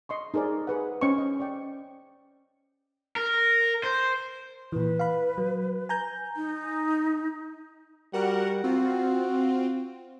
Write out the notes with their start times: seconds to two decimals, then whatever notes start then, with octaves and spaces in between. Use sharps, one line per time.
0.09 D#5 C6 C#6
0.34 D#4 G#4 A#4 C5 D5
0.67 G#4 B4 F#5
1.01 C#4 C5 D#5 C#6
1.18 D#5
1.40 D5 G5
3.16 A#4
3.84 C5
4.72 A#2 E3 B4
4.99 F5 B5
5.38 F#3
5.89 G#5 A#5 G6
6.36 D#4
8.13 G3 F#4 A#4 F#5
8.64 C4 F4 F#4